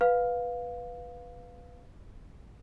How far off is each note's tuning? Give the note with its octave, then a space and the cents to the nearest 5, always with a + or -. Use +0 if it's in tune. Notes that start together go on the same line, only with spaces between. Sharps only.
B4 +0 F5 +10